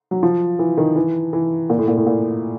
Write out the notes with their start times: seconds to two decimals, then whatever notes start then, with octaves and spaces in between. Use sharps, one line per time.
0.11 F#3
0.23 F3
0.59 E3
0.77 D#3
0.96 E3
1.33 E3
1.70 A#2
1.78 A2
1.88 A#2
1.97 A2
2.06 A#2